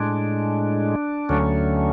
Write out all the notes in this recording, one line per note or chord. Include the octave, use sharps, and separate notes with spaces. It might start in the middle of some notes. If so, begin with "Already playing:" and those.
Already playing: A2 G#3 D4
D2 D3 F#3 A3 C#4